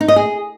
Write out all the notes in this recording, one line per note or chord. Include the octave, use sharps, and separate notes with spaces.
D#4
D#5
G#4